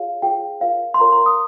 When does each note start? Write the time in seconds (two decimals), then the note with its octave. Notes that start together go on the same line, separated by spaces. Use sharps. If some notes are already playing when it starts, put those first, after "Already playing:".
Already playing: F4 G#4 C#5 F5
0.22 F4 G#4 C#5 G5
0.60 F4 A#4 C#5 F5
0.94 C6
1.00 F4 A#4 C#5 A#5
1.12 C6
1.26 D#6